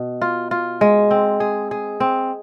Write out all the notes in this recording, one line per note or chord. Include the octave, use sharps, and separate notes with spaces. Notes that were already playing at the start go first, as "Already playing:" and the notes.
Already playing: B2
F4
F4
G#3
C4
G#4
G#4
C4